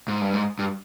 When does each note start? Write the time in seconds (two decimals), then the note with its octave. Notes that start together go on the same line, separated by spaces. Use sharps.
0.08 G#2
0.21 G2
0.34 G#2
0.59 G2